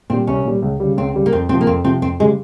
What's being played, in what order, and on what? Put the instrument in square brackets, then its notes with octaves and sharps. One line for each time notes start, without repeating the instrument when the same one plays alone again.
[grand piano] A#2 G3 [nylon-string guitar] C4
[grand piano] C2 [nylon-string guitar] C#4
[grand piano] A#2 G3
C#2
C#3 G3
[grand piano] C#2 [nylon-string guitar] C4
[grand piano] C#3 G3
[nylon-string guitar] A#3
[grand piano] F2 [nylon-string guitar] C4
[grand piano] C3 F3 [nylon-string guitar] C4
[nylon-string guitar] A#3
[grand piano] F2 [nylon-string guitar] C4
[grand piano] C3 F3 [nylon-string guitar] C4
[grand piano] F2 [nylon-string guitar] C4
[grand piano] C#3 G3 [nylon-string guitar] G#3